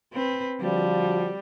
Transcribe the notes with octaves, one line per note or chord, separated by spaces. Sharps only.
C4 B4
D3 F3 G3 F#4